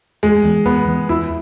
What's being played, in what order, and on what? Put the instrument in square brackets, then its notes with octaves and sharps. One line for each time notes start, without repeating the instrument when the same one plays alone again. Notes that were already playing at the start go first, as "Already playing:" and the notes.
[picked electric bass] E2 [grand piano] G#3
[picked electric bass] E3 B3
[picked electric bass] E2 [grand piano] B3
[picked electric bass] E3 B3
[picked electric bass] E2 [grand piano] E4